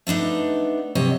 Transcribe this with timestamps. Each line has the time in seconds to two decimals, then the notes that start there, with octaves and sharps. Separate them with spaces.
0.07 A3 B3 D4 D#4
0.95 C3 F#3 C#5 D#5